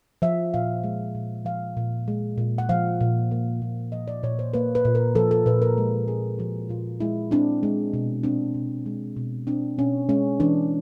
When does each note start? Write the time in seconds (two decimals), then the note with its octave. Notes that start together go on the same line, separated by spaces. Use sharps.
0.22 F3 E5
0.54 A#2 F5
0.84 G#3
1.15 A#2
1.45 F3 F5
1.77 A#2
2.08 G#3
2.38 A#2
2.58 F#5
2.69 F3 F5
3.01 A#2
3.31 A#3
3.62 A#2
3.92 F3 D#5
4.08 D5
4.23 A#2 C#5
4.39 C5
4.54 A#3 B4
4.75 B4
4.85 A#2
4.95 A#4
5.15 F3 A4
5.31 A4
5.46 A#2 B4
5.62 A#4
5.78 G#3
6.08 C4 G#4
6.39 F3 F#4
6.69 A#2 F4
7.00 G#3 E4
7.31 C4 D4
7.63 G#3
7.93 B2
8.23 C4 D4
8.55 B2
8.86 G#3
9.17 B2
9.47 C4 D4
9.78 B2 C#4
10.09 G#3 C#4
10.40 E3 D4